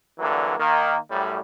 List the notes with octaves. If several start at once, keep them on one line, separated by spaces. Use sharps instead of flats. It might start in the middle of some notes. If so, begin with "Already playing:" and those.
D3 E3 F#3 G3 A#3
D#3 A#3
F#2 A2 G3